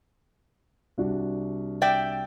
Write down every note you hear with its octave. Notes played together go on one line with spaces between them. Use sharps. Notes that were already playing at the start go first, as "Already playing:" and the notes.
C2 D4 F#4
D5 E5 G5